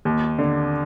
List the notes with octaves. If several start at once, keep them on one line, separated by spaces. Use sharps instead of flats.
D#2
D3